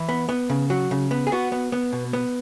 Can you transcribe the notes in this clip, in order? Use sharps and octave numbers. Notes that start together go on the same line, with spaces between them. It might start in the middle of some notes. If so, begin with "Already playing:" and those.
Already playing: E3
B3
B3
C#3
F#3 F#4
C#3
B3
G#4
B3 F#4
B3
B3
B2
B3